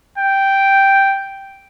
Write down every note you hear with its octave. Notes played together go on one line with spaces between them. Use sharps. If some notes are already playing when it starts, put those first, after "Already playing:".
G5